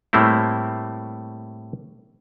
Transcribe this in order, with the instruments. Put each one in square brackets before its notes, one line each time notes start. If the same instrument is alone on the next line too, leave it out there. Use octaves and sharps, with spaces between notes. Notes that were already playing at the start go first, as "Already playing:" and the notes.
[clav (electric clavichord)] A2 G3 A3 A#3 C4 E4